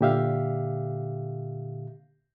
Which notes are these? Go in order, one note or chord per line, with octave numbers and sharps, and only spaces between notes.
A#2 D3 G4 E5 F5